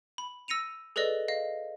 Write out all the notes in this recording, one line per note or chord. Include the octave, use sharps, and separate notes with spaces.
B5
E6 A#6 C#7 D#7 F7
G#4 A4 B4 D5 D#5
D#5 F5